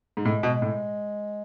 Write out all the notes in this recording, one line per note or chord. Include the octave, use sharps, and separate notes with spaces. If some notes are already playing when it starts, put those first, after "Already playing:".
G#2
A2 G#3
B2
A2